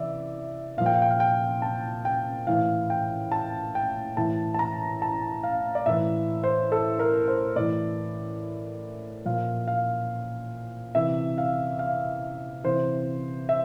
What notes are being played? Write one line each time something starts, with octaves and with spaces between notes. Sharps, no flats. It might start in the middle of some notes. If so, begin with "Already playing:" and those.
Already playing: C3 E3 D5 E5
A#2 F3 F5
G5
F5
G5
F5
G5
A5
G5
A2 E3 F5
G5
A5
G5
A2 E3 A5
A5
A#5
A5
F5
D5
A2 E3 E5
C5
A4
A#4
C5
A2 E3 D5
A#2 F3 F5
F5
C3 E3 E5
F5
F5
C3 E3 C5
E5